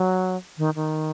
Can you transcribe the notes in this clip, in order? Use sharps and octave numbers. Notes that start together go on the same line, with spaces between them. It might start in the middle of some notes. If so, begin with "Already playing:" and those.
Already playing: F#3
D#3
D#3